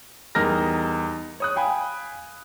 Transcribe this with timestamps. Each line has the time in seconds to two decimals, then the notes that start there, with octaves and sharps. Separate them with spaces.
0.35 E2 G3 D#4 A#4 F6 A#6
1.40 C#5 D#6 F#6
1.56 F5 G5 G#5 B5